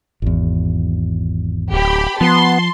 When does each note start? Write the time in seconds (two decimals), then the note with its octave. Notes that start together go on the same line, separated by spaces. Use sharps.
0.22 G#1 E2
1.73 D1 G4 B5
2.21 F3 B3 A5 C6